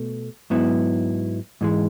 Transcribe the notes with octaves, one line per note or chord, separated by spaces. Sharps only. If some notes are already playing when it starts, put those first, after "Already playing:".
Already playing: B2 A3
G#2 F#3 B3 E4
G#2 E3 G#3